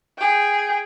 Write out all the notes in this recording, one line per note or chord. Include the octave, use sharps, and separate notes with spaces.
G#4 G5